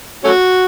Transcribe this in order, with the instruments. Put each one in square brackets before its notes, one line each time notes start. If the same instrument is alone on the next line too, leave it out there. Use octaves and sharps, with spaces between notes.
[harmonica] A3 C#4 F#4